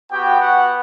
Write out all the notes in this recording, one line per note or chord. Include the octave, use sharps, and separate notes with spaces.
B3 F#4 G4 G5
F#4 F#5